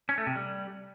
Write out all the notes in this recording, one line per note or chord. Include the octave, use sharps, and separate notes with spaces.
C#4
A3
C3
G3